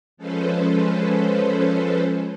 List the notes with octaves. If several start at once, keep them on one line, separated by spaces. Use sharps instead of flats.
F3 G#3 C#4 A4 B4 C5